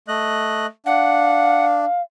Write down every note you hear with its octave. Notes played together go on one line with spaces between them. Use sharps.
A3 D#5 F#6
D4 F5 F#5